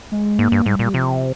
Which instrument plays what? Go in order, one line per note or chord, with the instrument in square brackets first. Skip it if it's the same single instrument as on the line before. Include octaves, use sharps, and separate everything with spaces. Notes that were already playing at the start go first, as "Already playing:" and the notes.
[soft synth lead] G#3
[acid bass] G#2 [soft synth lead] A#3
[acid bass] G2
[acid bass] G#2 [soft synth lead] G3
[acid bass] A#2
[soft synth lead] G3
[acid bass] C3 [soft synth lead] F3